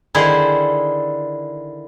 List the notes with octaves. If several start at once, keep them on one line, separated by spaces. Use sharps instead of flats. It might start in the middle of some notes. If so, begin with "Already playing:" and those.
D3 D#3 E4 G#4 C5